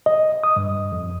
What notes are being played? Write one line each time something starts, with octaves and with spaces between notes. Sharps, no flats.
D#5
D#6
G2
F2